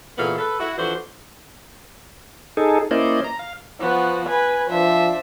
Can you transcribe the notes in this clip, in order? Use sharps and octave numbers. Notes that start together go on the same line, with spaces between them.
A#2 C#3 E3 B3 A4 F5
A4 B4
E4 F#4
E3 F3 D4 F#4 A4 C5
D#4 G#4 A4
A#3 C#4 E4 C5 D5 D#5
A#5
F5
F3 B3 F#4
B4 G#5
F3 D4 C5 E5